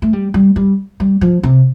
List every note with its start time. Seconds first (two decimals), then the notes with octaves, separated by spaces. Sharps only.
0.02 A3
0.13 G3
0.34 G3
0.56 G3
1.00 G3
1.21 F3
1.43 C3